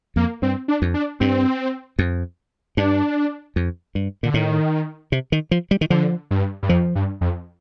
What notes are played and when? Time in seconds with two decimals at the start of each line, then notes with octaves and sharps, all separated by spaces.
0.16 F2 A#3
0.42 G2 C4
0.68 D4
0.82 F2
0.94 D4
1.20 G2 C4
1.99 F2
2.77 G2 D4
3.56 F2
3.95 G2
4.23 A#2 D3
4.34 A2 D#3
5.12 C3
5.32 D#3
5.51 F3
5.71 G3
5.81 D#3
5.90 D3 F3
6.31 G2
6.63 G2
6.69 F2 F3
6.95 G2
7.21 F2